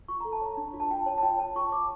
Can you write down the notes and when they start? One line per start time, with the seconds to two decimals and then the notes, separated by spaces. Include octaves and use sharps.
0.08 F4 C#6
0.20 A4 A#5
0.33 A5
0.41 C#5 A#5
0.57 D4
0.74 F4
0.80 A5
0.91 F4 G5
1.06 C#5 A5
1.18 A5
1.23 F4 G5
1.39 C#5 A5
1.56 F4 C#6
1.72 C#5 D6